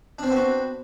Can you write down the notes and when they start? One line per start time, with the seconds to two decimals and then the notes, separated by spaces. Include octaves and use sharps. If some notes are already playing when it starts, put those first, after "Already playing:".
0.19 D4
0.23 C4
0.27 C5
0.32 B3
0.36 F#4